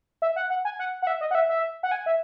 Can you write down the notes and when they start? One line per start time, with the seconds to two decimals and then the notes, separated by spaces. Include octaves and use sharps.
0.22 E5
0.36 F#5
0.50 F#5
0.65 G#5
0.79 F#5
1.02 F#5
1.07 E5
1.21 D#5
1.31 F#5
1.35 E5
1.49 E5
1.83 F#5
1.91 G#5
2.06 E5